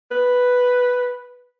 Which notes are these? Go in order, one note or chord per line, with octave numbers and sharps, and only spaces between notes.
B4